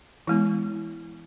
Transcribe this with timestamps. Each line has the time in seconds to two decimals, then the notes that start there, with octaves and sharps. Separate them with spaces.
0.27 E3 G#3 B3 E4